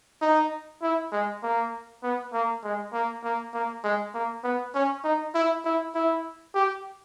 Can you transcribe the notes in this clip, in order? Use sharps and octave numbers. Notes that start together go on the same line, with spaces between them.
D#4
E4
G#3
A#3
B3
A#3
G#3
A#3
A#3
A#3
G#3
A#3
B3
C#4
D#4
E4
E4
E4
G4